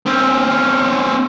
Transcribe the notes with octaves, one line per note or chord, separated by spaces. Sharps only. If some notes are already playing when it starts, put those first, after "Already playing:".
C4 C#4